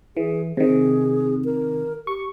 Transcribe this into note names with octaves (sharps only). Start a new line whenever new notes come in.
E3 G#4
C3 D#3 G#4
A#4
G4 C#6